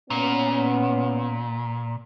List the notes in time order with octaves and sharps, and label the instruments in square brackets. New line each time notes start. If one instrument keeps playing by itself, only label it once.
[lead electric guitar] A#2 [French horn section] B3 C#4